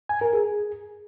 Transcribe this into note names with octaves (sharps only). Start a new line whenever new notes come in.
G#5
A#4
G#4